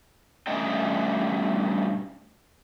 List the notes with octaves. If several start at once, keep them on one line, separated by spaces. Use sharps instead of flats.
G2 A3 C#4 D#5 G5